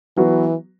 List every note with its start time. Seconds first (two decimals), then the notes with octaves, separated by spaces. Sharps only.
0.17 E3 F#3 B3 F#4